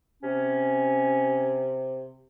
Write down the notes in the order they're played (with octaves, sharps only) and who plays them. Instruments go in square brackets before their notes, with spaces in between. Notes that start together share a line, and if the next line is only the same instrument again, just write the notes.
[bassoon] C3 [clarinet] C#4